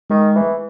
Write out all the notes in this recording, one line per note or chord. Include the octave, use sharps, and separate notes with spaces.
D#3 G#3
E3